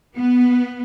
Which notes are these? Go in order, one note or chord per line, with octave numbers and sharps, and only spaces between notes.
B3